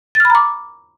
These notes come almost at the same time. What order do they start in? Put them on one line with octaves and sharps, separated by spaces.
A6 F6 B5 A#5 D6